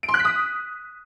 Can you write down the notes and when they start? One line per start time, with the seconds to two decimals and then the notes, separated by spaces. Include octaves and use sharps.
0.03 D7
0.09 C6
0.14 F#6
0.19 B6
0.25 D#6